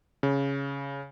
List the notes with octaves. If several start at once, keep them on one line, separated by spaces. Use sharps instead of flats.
C#3